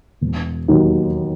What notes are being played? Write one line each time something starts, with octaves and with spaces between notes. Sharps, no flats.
E1
D#2 D#3 F#3